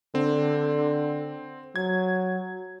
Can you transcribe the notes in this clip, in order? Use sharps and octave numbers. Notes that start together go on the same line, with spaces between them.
D3 C4
F#3 G#6